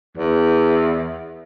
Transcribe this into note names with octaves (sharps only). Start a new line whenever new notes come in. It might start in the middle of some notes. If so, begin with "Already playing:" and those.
E2